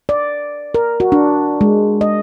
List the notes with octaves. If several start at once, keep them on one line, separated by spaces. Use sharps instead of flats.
D5
A#4
F#4
D4
G#3
D#5